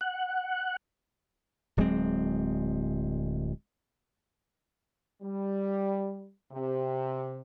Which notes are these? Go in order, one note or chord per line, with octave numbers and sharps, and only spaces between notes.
F#5
D1 F#3 G#3 C4
G3
C3